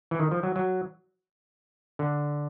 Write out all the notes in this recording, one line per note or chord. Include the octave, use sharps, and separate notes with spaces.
E3
D#3
F3
F#3
F#3
D3